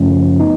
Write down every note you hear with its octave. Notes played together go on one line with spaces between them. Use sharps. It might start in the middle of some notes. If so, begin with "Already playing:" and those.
Already playing: F#2 C#3 F3 A3 C#4
B3 D#4